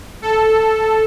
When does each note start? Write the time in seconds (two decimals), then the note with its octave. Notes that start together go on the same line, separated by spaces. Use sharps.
0.22 A4